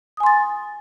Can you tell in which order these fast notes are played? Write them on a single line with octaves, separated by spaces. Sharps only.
D#6 G#5 C6 A6